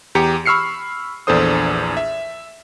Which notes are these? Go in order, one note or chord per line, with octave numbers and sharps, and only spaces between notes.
E2 G4 A#5 C#7
B5 C#6 E6 F6 C7 C#7
A#1 E2 D4 A4 C5 D#6
E5